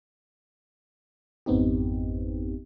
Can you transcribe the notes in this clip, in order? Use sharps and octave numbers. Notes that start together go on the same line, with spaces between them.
G#1 F2 B3 C4 D#4 G4